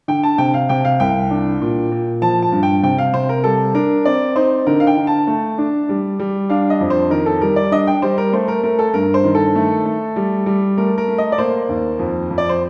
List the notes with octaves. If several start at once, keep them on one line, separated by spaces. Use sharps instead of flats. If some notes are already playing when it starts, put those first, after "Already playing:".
D3 G5
A5
C3 G5
F5
C3 G5
F5
C2 G5
D4
A#2
A#2
F3 A5
A5
G2
G5
C3 G5
F5
C3 C5
A#4
G3 A4
D4 A#4
C4 D5
D#4 C5
D3 A#4
F5
G5
D3
A5
A3
D4
G3
G3
D4 F5
D#5
F2
C5
D#3 A#4
A4
G3 A#4
D5
D4 D#5
G5
G3 C5
A#4
A3 C5
A#4
A3 A#4
A4
G2 A#4
C5
D#3
A4
A3
A3
G3
G3
A3 A#4
A#4
A3
D#5
D5
A#3 C5
D#2
F2
F2
D5
C5